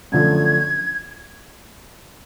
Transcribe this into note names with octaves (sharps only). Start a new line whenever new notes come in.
F#2 D3 F3 A3 G#6